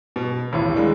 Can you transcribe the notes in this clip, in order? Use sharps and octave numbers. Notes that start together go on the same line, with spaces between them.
B2
D#1 A1 A2
E3 G#3 A#3 D4